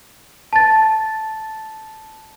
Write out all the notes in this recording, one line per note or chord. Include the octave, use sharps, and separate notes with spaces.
A5 A6